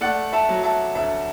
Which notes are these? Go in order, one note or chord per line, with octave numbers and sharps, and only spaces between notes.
A3 D5 F#5
E5 A5
F#3
E5 A5
D2 E5